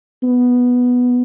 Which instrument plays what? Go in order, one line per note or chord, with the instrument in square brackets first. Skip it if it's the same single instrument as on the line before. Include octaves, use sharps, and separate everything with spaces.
[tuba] B3